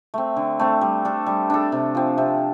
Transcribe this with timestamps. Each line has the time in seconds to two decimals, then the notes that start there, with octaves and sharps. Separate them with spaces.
0.14 A3 C4
0.36 D3
0.60 A3 C4
0.81 G3
1.05 D4 A4
1.26 G3
1.50 D4 A4
1.72 C3
1.95 F3 C4
2.18 C3